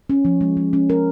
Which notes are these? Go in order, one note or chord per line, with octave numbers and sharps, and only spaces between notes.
C#4
F3
G#3
G#3
C#4
A#4